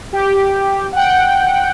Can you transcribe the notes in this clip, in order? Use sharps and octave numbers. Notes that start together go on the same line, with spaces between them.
G4
F#5 G5